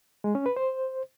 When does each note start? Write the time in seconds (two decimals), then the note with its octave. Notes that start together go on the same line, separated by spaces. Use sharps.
0.24 G#3
0.35 C#4
0.46 B4
0.56 C5